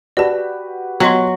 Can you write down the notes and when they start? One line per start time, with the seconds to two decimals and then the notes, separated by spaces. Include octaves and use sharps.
0.17 F#4 G4 B4 D5 A5
1.00 F#3 B3 D#5 C6